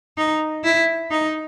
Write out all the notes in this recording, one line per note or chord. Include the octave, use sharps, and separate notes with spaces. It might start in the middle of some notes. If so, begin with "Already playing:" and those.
D#4
E4
D#4